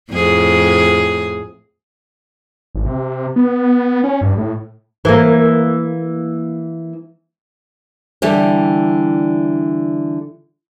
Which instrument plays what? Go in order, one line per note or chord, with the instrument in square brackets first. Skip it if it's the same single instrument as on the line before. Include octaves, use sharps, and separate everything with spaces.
[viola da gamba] F2 A2 G#4
[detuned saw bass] G#1
C3
B3
C#4
G2
A2
[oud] E3 A#3
[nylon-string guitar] D3 E3 G3 G4